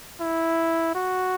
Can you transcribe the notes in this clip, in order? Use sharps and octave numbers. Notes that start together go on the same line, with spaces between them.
E4
F#4